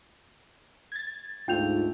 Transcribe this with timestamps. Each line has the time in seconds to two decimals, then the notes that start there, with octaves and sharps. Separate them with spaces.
0.92 G#6 A6
1.48 D2 G#2 F4 G5 G6 F7